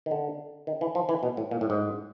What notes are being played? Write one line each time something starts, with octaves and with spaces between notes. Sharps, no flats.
D#3
D3
D#3
E3
F3
E3
B2
A2
A#2
A2
G#2